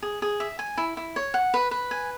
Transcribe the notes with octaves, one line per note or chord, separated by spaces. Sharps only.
G#4
G#4
E5
G#5
E4
E4
C#5
F#5
B4
B4
G#5